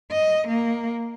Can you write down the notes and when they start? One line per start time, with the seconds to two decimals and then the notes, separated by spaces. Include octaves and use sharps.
0.12 D#5
0.48 A#3